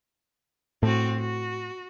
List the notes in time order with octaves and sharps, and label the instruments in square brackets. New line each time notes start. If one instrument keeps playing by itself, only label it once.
[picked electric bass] A2 [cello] C4 F#4
[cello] F#4